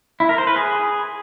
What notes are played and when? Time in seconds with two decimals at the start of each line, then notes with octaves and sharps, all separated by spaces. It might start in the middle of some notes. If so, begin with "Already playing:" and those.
0.20 E4
0.29 A#4
0.38 C5
0.47 B4
0.56 G#4